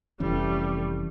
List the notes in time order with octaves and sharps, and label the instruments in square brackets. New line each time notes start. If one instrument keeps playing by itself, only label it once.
[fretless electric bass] F1 E3 C#4 [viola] G3 A3